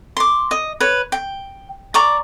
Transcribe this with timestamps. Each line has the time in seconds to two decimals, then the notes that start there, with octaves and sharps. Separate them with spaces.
0.17 C6 D6
0.51 D#5
0.80 B4 C#5
1.12 G5
1.94 D5 A#5 C#6 D6